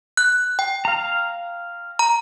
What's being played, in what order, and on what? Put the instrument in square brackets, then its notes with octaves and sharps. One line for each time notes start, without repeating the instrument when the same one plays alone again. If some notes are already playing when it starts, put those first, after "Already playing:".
[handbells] F#6
G5
[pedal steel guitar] F5 A#5
[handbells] A#5